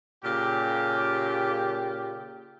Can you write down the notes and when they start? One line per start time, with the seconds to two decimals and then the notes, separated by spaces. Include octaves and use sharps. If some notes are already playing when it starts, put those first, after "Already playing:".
0.24 A#2 C#3 G4